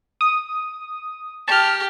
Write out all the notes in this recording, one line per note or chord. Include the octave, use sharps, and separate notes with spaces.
D#6
G4 A5 F6